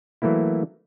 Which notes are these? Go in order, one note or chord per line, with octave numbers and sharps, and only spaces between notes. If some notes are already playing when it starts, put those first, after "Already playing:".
E3 F#3 A3 A#3 E4